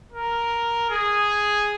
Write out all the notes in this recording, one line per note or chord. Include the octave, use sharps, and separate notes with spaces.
A#4
G#4